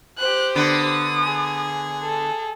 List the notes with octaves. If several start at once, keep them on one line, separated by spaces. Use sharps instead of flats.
G4 C5 F#6
D3 B3 B4 D#6
G#4
A4